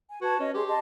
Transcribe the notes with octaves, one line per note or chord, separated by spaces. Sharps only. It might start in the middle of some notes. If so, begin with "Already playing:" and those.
G#5
F#4 B4 A5 G#6
C#4 D#5
G4 G#4 C6
D#5 A5 C6